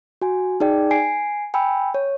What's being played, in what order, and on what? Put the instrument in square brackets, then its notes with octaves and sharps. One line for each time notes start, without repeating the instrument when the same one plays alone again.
[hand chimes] F#4 G#5
D#4 G#4 D5 G5
G#5 C7 D7
G5 G#5 B5 E6
C#5